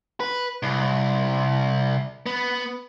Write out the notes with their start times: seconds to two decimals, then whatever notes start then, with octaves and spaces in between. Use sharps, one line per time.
0.20 B4
0.63 C2
2.26 B3